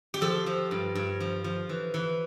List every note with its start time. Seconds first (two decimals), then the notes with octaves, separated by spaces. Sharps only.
0.14 G4
0.21 F3 A4
0.46 F3
0.71 G2
0.95 G2
1.20 F3
1.44 F3
1.69 E3
1.94 E3